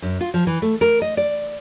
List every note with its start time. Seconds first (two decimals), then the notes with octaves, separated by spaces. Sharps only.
0.02 F#2
0.21 F4
0.34 F3
0.47 E3
0.62 A3
0.81 A#4
1.02 D#5
1.17 D5